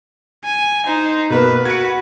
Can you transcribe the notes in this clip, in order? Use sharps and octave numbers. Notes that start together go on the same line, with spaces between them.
G#5
D#4 C5
B2 A#3 B3 B4
F#4 B4 G#6 C#7